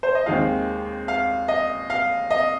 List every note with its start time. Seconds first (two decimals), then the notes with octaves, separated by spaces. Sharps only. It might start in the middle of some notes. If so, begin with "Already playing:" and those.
0.03 C5
0.15 D#5
0.26 D#2 D#3 G#3 C4 D#4 F5
1.08 F5
1.48 D#5
1.90 F5
2.31 D#5